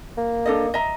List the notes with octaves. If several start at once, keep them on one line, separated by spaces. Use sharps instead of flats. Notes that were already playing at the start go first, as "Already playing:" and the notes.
A#3
D4 A4 D#5
D#5 E5 A#5